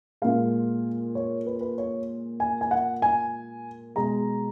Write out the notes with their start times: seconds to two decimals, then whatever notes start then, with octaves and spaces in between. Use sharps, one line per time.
0.22 A#2 G#3 F5
1.15 C#5
1.46 B4
1.61 B4
1.78 C#5
2.40 G#5
2.61 G#5
2.71 F#5
3.02 G#5
3.96 B2 G#3 A#5